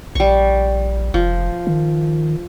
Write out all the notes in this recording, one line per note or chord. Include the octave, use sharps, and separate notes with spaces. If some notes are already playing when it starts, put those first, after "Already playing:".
A#1 G3 C#6
F1 F3
D#3